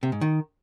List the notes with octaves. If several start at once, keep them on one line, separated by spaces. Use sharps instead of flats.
C3
G#2
D#3